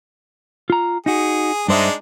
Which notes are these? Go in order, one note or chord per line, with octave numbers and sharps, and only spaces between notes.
F4 A#5
D#4 F#4 G#4
G2 G#3 D4 D#4 C5 E5